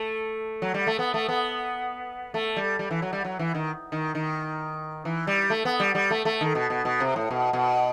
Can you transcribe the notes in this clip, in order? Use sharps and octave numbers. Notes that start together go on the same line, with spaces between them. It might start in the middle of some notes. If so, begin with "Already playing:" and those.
Already playing: A3
F#3
G3
A3
B3
A3
B3
A3
G3
G3
E3
F#3
G3
F#3
E3
D#3
D#3
D#3
E3
G3
A3
B3
G3
G3
A3
A3
D#3
B2
B2
B2
C3
A2
B2
B2